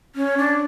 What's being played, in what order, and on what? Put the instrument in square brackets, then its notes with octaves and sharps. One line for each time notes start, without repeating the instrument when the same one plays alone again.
[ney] C#4
D4